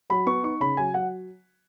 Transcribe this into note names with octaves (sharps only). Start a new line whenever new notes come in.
F#3 B5
B3 C#6
D#4 C#6
C#3 B5
F#3 G#5
F#3 F#5